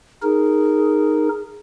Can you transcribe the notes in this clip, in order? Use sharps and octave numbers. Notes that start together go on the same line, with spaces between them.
D#4 G#4 A#4